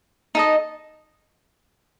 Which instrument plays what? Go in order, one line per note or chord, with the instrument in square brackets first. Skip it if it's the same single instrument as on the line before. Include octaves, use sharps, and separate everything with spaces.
[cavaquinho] D#4 A4 D#5